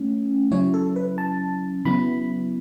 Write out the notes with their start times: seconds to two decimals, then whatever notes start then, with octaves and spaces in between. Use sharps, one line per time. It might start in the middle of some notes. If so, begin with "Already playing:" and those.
Already playing: A3 C#4
0.51 C#3 F#3 C#4 E4 C#5
0.74 A4
0.96 B4
1.18 A5
1.85 C#3 F#3 B3 E4 B5